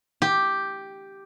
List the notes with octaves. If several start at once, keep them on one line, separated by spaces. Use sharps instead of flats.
G4